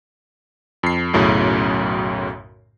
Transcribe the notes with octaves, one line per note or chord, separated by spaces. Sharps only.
F2 C7
B1 F#2 A2 C#3